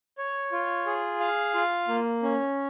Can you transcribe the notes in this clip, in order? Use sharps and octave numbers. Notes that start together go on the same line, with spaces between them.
C#5
F4
G#4
F5
F4
A#3
C#4